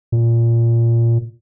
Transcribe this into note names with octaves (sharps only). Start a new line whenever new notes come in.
A#2